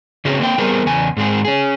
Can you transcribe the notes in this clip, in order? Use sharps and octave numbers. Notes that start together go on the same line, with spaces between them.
C#3 C4 C#4 F#4 G#4
A#3 C4 D5 G5
G3 B3 C4 G#4 A#4 C5
E2 C#3 G#5
G#2 G#3 C4 G#4
C#4 G#4